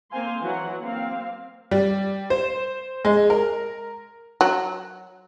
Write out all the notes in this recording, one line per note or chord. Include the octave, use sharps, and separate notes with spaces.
A#3 C4 C5 F5 G#5 C6
E3 F#3 F#5
A#3 C4 F5
G3
C5
G#3
A#4
F#3